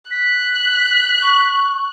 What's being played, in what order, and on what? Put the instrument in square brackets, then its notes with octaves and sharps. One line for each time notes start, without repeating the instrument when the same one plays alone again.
[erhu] F#6 [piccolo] B6
[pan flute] C#6